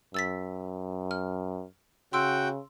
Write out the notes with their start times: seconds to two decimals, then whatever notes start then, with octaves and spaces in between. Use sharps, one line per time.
0.14 F#2 E6 A6 B6
1.11 F6
2.13 C#3 F#4 G5 C6 E6 D7